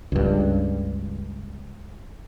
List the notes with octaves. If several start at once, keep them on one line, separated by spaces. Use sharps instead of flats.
C#2 G2